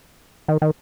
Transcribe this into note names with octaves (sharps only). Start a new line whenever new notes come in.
D#3
D#3